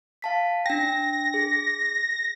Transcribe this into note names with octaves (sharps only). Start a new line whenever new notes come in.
F5 A5 B6
D4 G5 A#6
G#4